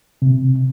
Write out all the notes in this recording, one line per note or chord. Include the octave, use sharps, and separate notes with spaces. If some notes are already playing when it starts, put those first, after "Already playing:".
C3